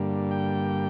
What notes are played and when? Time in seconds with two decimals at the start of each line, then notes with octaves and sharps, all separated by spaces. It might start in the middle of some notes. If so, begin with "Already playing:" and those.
Already playing: G2 D3 G3 A#3
0.31 G5